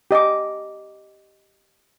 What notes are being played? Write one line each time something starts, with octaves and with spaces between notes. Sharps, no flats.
G4 D#5 A5 D6